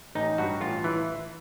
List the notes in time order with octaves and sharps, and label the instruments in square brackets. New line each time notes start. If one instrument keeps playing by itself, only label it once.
[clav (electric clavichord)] A1 D#4
G2 F#4
A1 F4
E3